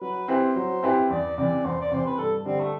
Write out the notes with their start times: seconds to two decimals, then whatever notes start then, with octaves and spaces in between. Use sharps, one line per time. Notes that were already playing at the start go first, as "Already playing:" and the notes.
0.01 F#3 B4
0.28 C4 E4 G4 B4 C5
0.56 F#3
0.83 C4 E4 G4 B4
1.10 E2 D5
1.37 C3 E3 D5
1.65 E2 C5
1.81 D5
1.91 C3 E3 C5
2.07 B4
2.18 G2 A4
2.46 D3 G3 C4 D4
2.60 A3